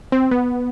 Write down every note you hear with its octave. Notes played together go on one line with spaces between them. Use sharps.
C4
B3